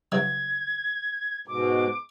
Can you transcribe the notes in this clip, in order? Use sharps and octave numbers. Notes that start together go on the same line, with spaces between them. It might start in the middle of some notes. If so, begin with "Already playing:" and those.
C#3 E3 F#3 G#6
G#2 B2 D6